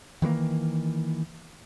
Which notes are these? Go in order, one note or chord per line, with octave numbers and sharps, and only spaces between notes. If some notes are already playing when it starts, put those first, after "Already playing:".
D#3 E3 G#3 A#3